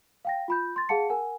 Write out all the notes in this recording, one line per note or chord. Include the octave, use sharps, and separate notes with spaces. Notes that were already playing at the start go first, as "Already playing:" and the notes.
F5 G5 A#6
F4 B5 G6
C6 A6
G#4 F5 F#5 A5 C#7
A#4 F#5 G#5